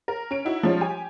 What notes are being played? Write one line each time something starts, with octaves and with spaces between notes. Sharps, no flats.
A#4
C#4 D7
D#4 E4 F#4 F#5
F3 G3 G#3 C#4 D#4 F4
G4 G#5